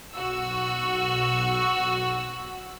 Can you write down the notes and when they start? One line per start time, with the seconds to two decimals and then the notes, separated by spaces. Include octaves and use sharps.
0.13 B1 F#4 E6